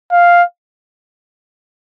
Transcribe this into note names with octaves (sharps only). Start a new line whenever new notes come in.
F5